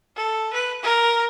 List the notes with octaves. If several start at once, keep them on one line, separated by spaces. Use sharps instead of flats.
A4
B4
A#4